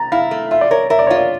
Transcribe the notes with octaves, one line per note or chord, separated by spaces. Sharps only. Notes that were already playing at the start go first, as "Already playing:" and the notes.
Already playing: A#5 A6
E4 F5
A3
F4 E5
D5
A#4 C#5
A#4 E5
D5
C#5
F4
D5